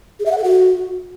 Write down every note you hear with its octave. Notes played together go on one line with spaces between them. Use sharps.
G#4
E5
F#5
A4
F#4